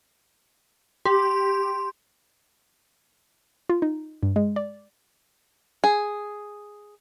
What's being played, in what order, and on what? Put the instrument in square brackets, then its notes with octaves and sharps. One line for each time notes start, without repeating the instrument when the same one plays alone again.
[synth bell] G4 [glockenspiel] C6
[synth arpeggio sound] F4
D#4
G2
G#3
D5
[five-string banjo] G#4